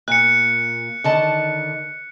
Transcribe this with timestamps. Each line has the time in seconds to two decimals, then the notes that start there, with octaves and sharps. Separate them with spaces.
0.08 A#2 F#6 C#7
1.04 D3 D#3 A5